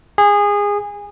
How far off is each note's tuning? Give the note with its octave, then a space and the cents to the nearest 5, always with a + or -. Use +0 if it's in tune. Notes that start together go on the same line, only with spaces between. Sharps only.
G#4 -20